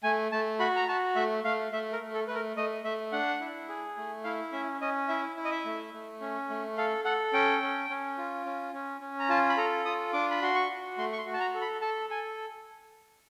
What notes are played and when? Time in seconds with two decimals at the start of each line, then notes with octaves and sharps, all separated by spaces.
0.03 A3 G#5
0.32 A3 A5
0.59 F#4 B5
0.76 A#5
0.88 F#4 A5
1.15 A3 E5
1.44 A3 F5
1.72 A3 E5
1.93 A#4
2.01 A3
2.14 A4
2.27 A3 B4
2.35 A#4
2.57 A3 D#5
2.84 A3 E5
3.12 D4 F#5
3.41 E4
3.68 G#4
3.97 A3
4.24 E4 F5
4.52 C#4 E5
4.81 C#4 D#5
5.08 E4 E5
5.36 E4
5.45 D#5
5.51 E5
5.65 A3
5.94 A3
6.20 C#4
6.50 A3
6.78 A4 F5
7.05 A4 F#5
7.33 C#4 G5
7.62 C#4
7.90 C#4
8.18 F4
8.46 C#4
8.73 C#4
9.01 C#4
9.19 A#5
9.29 F4 A5
9.49 B5
9.57 A4 A#5
9.85 F4 D#6
10.13 D4 D6
10.31 B5
10.42 F#4 C6
10.56 C#6
10.70 F#4
10.98 A3 C6
11.13 C#6
11.18 C6
11.26 F#4
11.33 A5
11.40 A#5
11.54 A4
11.61 B5
11.81 A4 A5
12.10 A4 G#5